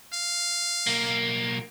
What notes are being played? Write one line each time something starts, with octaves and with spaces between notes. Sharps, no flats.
F5
B1 A#3